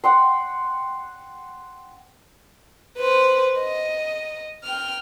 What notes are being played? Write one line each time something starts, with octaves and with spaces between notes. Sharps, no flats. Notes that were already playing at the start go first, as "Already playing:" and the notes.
F#5 G5 C6
B4 C5
D#5
G5 F6